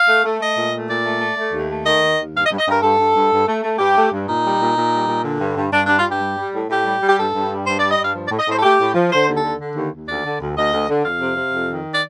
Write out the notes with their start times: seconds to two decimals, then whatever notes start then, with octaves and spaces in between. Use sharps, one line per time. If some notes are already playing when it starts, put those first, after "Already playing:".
Already playing: F5
0.08 A3
0.24 A3
0.41 A3 D#5
0.56 A#2
0.73 A3
0.88 A#2 D5
1.05 A3
1.21 A3
1.37 A3
1.53 D#2
1.70 A3
1.86 D#3 D#5
2.01 D#2
2.18 D#2
2.34 G2 F5
2.46 D#5
2.51 G2
2.58 D#5
2.67 G2 A#4
2.83 G2 A4
2.99 G2
3.15 G2
3.31 G2
3.47 A3
3.63 A3
3.79 G2 G4
3.95 A3
4.12 G2
4.27 A#2 D#4
4.43 G3
4.60 A#2
4.76 A#2
4.92 G3
5.08 A#2
5.24 D3
5.40 G2
5.56 G2
5.72 G2 D4
5.85 D4
5.89 G3
5.97 F4
6.05 G2 G4
6.21 G3
6.38 G3
6.54 A2
6.69 A2 G4
6.86 G3
7.01 G3
7.08 G4
7.18 G2 A4
7.34 G2
7.50 G3
7.66 G2 C5
7.78 D5
7.82 G3
7.90 D#5
7.98 G2 F5
8.14 F3
8.27 D5
8.31 A2
8.39 D#5
8.47 A2 C5
8.58 A4
8.63 A3 G4
8.79 A2
8.95 F3
9.11 D3 C5
9.27 D#2
9.35 A4
9.44 D3
9.59 D3
9.76 D#2
9.92 D#2
10.08 D2 D5
10.25 D3
10.40 D2
10.56 D2 D#5
10.73 D2
10.88 D3
11.05 F2 F5
11.21 C3
11.37 C3
11.53 F2
11.69 D#3
11.93 D5